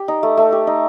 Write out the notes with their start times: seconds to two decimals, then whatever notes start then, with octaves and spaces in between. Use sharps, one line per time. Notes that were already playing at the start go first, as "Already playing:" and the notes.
Already playing: G4
0.08 D#4
0.23 A3
0.37 A3
0.52 G4
0.67 D#4